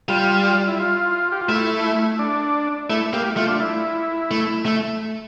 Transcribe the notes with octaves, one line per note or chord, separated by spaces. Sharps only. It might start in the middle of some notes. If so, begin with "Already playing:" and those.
G3 F4
E4
F4
G4
F4
A3 E4
D4
A3 E4
A#3 G4
A3 F4
D4
E4
A3
A3